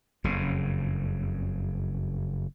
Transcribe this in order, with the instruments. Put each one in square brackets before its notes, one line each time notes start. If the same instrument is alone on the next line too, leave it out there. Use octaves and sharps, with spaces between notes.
[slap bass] F#1 F2 C#3